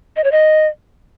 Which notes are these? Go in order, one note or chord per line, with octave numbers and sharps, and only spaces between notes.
D#5
C#5
D#5